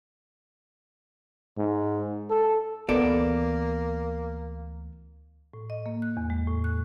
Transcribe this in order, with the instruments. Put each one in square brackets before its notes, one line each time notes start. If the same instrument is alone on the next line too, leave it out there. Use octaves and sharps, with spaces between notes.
[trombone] G#2
A4
[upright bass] D2 E3 [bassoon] A#3 [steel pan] B3 [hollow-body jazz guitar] A4 D5
[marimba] A2
D#5
A#3
F#6
E2
G#3
A2
F#6